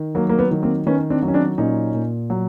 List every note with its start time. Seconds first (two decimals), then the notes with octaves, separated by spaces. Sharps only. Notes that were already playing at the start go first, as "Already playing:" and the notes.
Already playing: D#3
0.15 F#3 A#3
0.30 A#3
0.39 B3
0.51 D#3
0.62 A#3 C4
0.87 D#3 B3 C#4
1.10 C4 D4
1.22 F#3
1.28 C#4
1.34 C4 D4
1.58 A#2 C#4 D#4
1.94 A#2
2.30 F#3